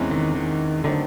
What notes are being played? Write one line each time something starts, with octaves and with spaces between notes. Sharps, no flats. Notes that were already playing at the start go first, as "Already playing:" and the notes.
Already playing: E2 C3 E3 G#3 C#4
D#3
D#3
D3 D#3 F#3 A3 C4 D#4